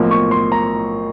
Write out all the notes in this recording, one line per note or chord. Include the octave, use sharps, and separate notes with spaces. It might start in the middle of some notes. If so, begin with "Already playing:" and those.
Already playing: B1 A2 F3 A#3
C#6
C6
A#5